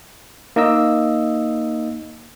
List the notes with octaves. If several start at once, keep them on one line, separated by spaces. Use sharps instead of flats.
A#3 D#4 D#5 E6